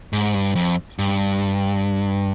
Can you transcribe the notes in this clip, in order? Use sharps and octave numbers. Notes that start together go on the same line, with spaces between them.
G#2
G2
F2
G2